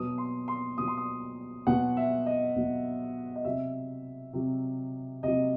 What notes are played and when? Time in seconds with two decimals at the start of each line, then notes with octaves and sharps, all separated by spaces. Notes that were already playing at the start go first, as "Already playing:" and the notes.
Already playing: B2 F#3 D#6
0.18 C6
0.48 C6
0.78 B2 F#3 D#6
0.88 C6
0.97 D#6
1.67 B2 F#3 F#5
1.97 E5
2.26 D#5
2.56 B2 F#3
3.36 D#5
3.45 C3 F#3 E5
4.33 C3 F#3
5.23 C3 F#3 D#5